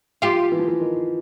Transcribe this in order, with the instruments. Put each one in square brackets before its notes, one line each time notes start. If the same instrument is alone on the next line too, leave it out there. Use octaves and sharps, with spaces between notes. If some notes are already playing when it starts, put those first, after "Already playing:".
[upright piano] F3 [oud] F4 G4
[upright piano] E3
F3
E3
D#3